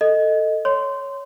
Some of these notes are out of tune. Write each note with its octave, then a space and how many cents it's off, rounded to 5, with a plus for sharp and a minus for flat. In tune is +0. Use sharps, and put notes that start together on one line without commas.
A4 +15 D#5 +0
C#5 +0 C6 -15